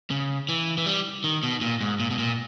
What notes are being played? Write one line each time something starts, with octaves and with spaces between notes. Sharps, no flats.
C#3
E3
E3
G3
D#3
B2
A#2
G#2
A#2
B2
A#2